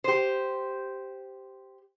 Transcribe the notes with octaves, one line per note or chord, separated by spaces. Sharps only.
G4 C5